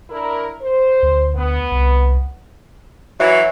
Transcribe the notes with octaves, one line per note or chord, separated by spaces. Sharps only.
D4 E4 A#4
C5
D2
D2 B3
C2
E3 F#3 E5